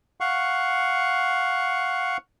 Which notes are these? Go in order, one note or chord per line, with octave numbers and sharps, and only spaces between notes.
F5 F#5 C#6